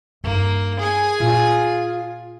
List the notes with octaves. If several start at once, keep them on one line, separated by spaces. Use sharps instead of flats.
G2 A#3 D#4
G#4 G#5
A#2 F4